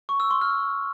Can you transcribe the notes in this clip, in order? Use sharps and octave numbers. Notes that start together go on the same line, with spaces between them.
C#6
E6
C6
F6